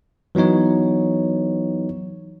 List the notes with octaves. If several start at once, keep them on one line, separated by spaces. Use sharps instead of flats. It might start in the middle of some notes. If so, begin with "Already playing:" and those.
E3 F#3 B3 D#4 C#5